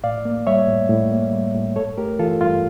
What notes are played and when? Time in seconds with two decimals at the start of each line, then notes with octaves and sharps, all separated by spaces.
0.04 A2 D5 F5
0.25 A#3
0.47 G3 C#5 E5
0.68 A2
0.89 A2
1.11 A#3
1.33 G3
1.55 A2
1.76 G2 A4 C#5
1.98 A3 G4 A#4
2.19 E3 F4 A4
2.41 G2 F4